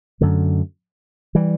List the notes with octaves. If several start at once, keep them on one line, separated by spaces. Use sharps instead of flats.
F#2 D3 A3
E3 G3